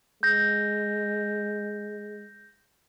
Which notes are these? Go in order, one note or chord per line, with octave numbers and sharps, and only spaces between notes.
G#3 G6 A#6